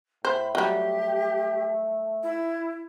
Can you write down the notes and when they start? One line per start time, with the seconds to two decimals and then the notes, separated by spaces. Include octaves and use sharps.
0.25 A2 C5 B5
0.55 F#3 G3 A3 G4
2.23 E4